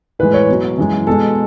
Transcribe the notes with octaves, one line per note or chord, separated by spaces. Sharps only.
A2 E3 G#3 B4
C#5
B2 F#3
F#2 E3 G#3
B2 G#3 A4